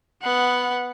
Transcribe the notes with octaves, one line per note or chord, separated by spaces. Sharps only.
B3 F#5